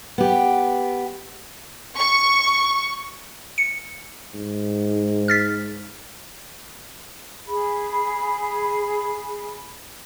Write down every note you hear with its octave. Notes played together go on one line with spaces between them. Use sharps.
B3 G4
C#6
C#7
G#2
F6 A6 B6
G#4 B5